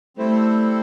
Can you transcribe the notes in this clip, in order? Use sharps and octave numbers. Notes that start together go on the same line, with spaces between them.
G3 A3 C4 E4 A4 C5